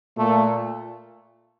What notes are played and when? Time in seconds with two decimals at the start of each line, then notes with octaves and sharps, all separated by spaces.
0.17 A#2 A3